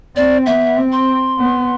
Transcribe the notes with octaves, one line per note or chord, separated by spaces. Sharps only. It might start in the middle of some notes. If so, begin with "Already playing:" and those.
C4 D5
B3 E5
C4
C6
B3